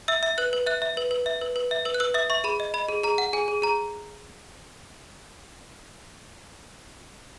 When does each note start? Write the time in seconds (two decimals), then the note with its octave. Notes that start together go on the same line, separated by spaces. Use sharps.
0.08 E5 E6
0.23 E5
0.38 B4 F#6
0.53 B4
0.67 E5 F#6
0.82 E5
0.97 B4
1.11 B4
1.26 E5
1.41 B4
1.56 B4
1.71 E5
1.85 B4 E6
1.94 F#6
2.00 B4 E6
2.14 E5 D#6
2.30 E5 C#6
2.44 G#4 B5
2.60 D#5
2.74 D#5 B5
2.89 G#4
3.03 G#4 A#5
3.18 F#5
3.33 G#4 G#5
3.48 G#4
3.62 G#4 A#5